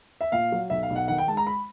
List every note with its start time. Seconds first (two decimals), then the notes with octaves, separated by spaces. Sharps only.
0.21 E5
0.32 A#2 F5
0.52 F#3
0.70 B1 E5
0.83 F5
0.90 B1
0.96 F#5
1.08 D#3 F#5
1.18 G5
1.27 G#3 A5
1.37 A#5
1.47 B5